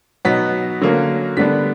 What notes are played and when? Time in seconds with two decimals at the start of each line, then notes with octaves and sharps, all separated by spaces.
0.25 B2 F#3 B3 D#4 B6
0.81 D3 F#3 A#3 C#4
1.37 D3 G3 B3 D4 B6